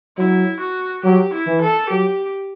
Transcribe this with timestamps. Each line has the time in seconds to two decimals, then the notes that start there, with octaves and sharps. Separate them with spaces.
0.17 F#3 E4
0.61 F#4
1.04 F#3 G4
1.33 E4
1.47 E3
1.62 A4
1.90 F#3 G4